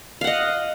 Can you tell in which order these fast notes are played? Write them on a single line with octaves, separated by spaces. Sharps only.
F5 F#5 D#5